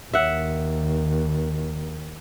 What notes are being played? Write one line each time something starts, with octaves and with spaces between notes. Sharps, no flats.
D#2 E5 F#5